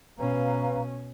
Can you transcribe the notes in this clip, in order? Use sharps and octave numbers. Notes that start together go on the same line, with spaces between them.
B2 C#4 B4 F5 A#5